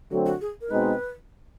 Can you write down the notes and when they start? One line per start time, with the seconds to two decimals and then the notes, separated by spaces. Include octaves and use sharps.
0.11 D3 F#3 A3 C4 F#4
0.26 F#4
0.41 G#4
0.61 A#4
0.71 B2 G#3 C4 D#4 B4